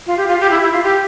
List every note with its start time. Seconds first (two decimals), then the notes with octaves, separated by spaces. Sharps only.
0.06 F4
0.17 G4
0.28 F4
0.40 G4
0.51 E4
0.62 E4
0.72 F4
0.83 G4